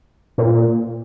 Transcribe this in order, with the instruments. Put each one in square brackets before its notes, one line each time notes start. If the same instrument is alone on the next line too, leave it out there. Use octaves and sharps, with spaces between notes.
[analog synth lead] A#2